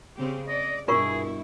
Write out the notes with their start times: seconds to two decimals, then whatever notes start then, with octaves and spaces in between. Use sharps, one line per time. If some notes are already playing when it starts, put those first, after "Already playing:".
0.15 C#3 C4 G4
0.48 D5 D#5
0.88 G2 B2 E4 F4 G#4 A#4 C#6